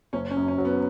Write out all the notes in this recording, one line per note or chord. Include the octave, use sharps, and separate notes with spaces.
F#1 C#4
C#4
F#2
C#4
F#3
B3